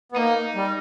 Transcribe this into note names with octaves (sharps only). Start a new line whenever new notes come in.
B3
A#3 D#4
G3